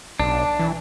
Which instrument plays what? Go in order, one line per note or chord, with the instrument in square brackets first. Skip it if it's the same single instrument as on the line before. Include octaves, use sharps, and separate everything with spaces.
[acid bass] B1 [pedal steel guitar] D4
[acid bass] E3